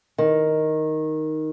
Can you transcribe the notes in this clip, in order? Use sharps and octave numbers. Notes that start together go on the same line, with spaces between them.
D#3